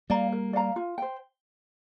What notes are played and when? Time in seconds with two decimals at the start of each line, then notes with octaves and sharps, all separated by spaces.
0.10 G3 A#3 D5 F5 A#5
0.32 A#4
0.53 D5 F5 A#5
0.76 F4
0.98 C5 G5